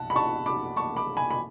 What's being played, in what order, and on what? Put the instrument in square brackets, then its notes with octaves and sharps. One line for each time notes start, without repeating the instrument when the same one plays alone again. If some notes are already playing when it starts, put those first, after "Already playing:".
Already playing: [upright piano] B1 F#5 A5
B5
A5 C#6
B5 D6
A5 C#6
B5 D6
G#5 B5
B5